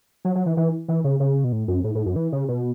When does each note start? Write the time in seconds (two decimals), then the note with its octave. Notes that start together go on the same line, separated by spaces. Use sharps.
0.25 F#3
0.35 F#3
0.46 E3
0.57 E3
0.88 E3
1.04 C#3
1.20 C#3
1.44 B2
1.52 A2
1.68 F#2
1.84 A2
1.95 A2
2.06 F#2
2.16 E3
2.32 C#3
2.48 B2